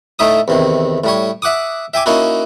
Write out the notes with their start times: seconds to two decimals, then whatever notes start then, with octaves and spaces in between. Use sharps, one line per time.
0.19 A2 A3 D#4 E5 D#6
0.48 E2 C3 D#3
1.04 A2 G3 C#5
1.42 E5 F#5 D6 D#6
1.94 E5 G5 G#5 D6
2.06 A#3 C#4 D#4 E4 F#4